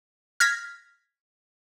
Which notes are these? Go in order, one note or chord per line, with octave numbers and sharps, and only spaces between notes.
F6 G#6 A#6 B6